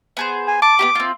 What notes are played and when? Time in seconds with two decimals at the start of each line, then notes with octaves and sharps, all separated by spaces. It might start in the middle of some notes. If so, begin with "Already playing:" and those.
0.17 B3 G#4 C5
0.48 G#5
0.62 A5 D6
0.79 B3 F#4 G4
0.95 C4 F4